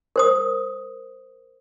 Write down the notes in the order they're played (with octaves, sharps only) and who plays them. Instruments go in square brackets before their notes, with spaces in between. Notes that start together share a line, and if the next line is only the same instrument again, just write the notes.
[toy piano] A#4 C5 D#6